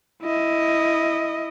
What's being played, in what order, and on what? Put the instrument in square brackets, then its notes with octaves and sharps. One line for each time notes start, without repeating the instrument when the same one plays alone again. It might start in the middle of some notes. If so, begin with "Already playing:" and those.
[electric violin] E4 D#5